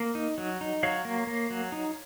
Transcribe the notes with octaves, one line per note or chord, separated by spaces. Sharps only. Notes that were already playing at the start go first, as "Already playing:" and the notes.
Already playing: A#3
D#4
F#3
D#4
F#3 C#5 F5
A#3
A#3
F#3
D#4